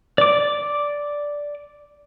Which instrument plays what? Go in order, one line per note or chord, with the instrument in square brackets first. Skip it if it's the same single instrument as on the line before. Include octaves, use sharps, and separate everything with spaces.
[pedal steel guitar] D5 D6